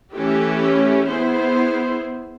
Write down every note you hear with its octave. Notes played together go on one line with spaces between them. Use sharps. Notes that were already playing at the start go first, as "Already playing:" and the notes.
E3 A3 C#4 E4 G4
B3 E4 G#4 C5